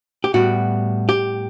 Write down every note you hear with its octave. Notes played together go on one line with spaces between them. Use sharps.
G4
A2 G3 B3 F#4
G4